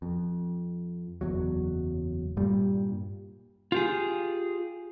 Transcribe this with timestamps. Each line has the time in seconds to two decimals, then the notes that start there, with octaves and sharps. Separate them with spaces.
0.02 F2
1.21 F#1 B1 E2 F#3
2.37 G2 A#2 G3
3.72 F4 G4 G#4